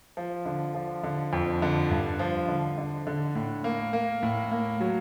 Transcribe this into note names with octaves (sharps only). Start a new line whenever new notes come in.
F3
D3
F3
D3
F2
D3
G2
F3
D3
D3
D3
A2
A#3
A#3
A2
A#3
F#3